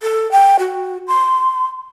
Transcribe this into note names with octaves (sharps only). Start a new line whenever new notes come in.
A4
G5
F#4
C6